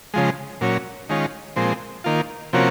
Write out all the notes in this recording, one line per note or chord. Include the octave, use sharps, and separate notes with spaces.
C#3 F3 G#3
A#2 F#3 C#4
D#3 G#3 C#4 F4
A#2 F3 G#3 C4
D#3 A#3 F4
C3 F3 A#3 C#4 F#4